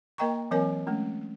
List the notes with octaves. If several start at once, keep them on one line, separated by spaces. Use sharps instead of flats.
A#3 A#4 D#5 G5 A#5 C#6
E3 F#3 C4 A#4 C#5 G#5
G#3 A3 C#4